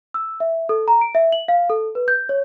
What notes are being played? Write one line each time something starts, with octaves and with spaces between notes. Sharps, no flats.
E6
E5
A4
A#5
D7
E5
F#7
F5
A4
B4
G6
C#5